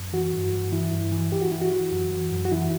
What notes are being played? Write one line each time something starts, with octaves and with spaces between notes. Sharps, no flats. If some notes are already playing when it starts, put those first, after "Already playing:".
Already playing: F#2
E3 F#4
G2
G2
E3 E4
G2
E3
E3 G4
F#4
E3 E4
F#4
E3
F#2
E3
F#2
F#4
E3 E4